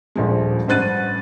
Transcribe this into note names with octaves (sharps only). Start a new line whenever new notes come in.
D#1 A#1 F3 G#3
A1 G2 C5 F#6 A6 D#7